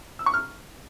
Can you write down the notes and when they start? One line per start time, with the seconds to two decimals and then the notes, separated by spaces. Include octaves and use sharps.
0.19 E6
0.26 C#6
0.34 F6